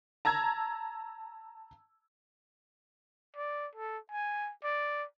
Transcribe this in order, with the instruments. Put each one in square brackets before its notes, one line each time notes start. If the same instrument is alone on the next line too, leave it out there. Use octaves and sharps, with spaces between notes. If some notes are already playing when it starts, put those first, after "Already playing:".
[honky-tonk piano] A5 A#5 E6 G#6
[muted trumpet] D5
A4
G#5
D5